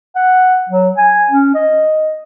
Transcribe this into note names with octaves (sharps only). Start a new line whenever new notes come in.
F#5
F#3
G#5
C#4
D#5